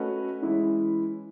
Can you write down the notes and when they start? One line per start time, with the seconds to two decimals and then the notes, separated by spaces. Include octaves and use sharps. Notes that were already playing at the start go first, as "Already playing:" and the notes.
Already playing: A3 C#4 F#4 B4 D#5
0.42 E3 G#3 C#4 E4